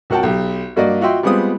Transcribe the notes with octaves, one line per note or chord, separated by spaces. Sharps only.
C#2 F#4 A#4 F#5 G5 A5
B1 G4
G2 A#3 F#4 D5 D#5
F4 F#4 D#5 E5 G5 C6
G3 G#3 B3 C4 F4 D#6